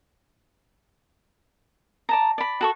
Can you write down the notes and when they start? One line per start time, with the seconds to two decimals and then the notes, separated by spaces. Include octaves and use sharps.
2.09 D5 A5 A#5
2.38 D5 B5
2.61 F#4 A4 C#6